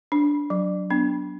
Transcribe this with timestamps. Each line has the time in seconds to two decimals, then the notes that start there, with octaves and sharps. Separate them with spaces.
0.12 D4
0.50 F#3
0.90 B3 D4